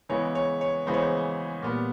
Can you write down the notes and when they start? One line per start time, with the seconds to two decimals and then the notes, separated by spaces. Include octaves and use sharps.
0.09 C#3 E3 G#3 B3 C#5
0.35 C#5
0.61 C#5
0.86 C#3 E3 G#3 B3 C5
0.94 C#5
1.02 C5
1.62 A#2 G3 B3